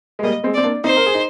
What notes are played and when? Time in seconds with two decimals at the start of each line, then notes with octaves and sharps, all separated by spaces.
0.19 G#3
0.23 G3 A#3 D#5
0.44 G#3 C4
0.54 C4 D5
0.64 A#3 D4
0.84 C4 D#4 C5
0.97 A#4
1.06 G#4
1.14 D#4